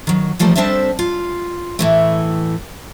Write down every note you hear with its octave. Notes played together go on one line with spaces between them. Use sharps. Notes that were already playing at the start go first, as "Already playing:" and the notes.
D#3 F#3
E3 F3 G3 A3 A#3
G3 C4 D4 A4 C5 E5
F4
A2 E3 A3